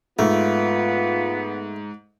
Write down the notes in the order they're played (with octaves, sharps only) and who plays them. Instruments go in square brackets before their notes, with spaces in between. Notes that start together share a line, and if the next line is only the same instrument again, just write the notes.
[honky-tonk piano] G#2 [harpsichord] A3 [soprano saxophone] B3 [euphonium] F4